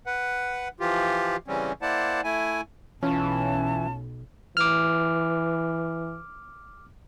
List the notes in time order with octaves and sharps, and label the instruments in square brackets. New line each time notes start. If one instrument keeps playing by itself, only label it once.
[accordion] B4 F#5
E3 F3 F4 G4
C#3 E3 G3 C4 C#4
A#3 E4 C5 D5 F#5 A5
A3 E4 G#5
[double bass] B1 [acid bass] E3 [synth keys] C#4 F4 [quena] A5
[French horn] E3 [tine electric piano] D6 F6